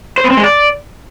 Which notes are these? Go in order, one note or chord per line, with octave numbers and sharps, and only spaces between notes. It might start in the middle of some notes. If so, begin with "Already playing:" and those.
C5
B3
C4
G#3
D5